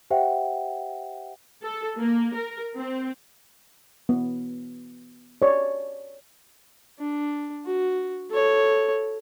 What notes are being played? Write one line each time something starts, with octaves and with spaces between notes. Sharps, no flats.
G4 C5 E5 F#5 G5
A4
A#3
A#4
C4
B3
C#5 D5
D4
F#4
A4 C#5